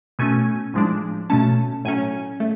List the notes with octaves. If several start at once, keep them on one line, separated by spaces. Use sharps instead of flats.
B2 A3 C#4 G#5
A2 F3 G#3 D4
B2 A3 C#4 A5
A2 F#3 C#4 G#5
A3